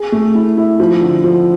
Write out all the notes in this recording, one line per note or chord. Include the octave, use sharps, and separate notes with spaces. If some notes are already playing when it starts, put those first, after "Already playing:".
Already playing: G#4
A3
E4
E4
F3
D3
F3